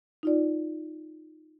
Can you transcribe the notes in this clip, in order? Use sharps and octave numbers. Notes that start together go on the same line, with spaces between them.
D#4 F4 D5